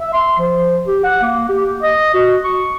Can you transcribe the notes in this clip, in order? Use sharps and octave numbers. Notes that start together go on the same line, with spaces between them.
E5
C6
F3
G4
F#5
A#3
G4
D#5
F#4
C#6